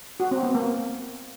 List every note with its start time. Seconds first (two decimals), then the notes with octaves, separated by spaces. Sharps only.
0.20 F#4
0.31 C4
0.43 B3
0.55 A#3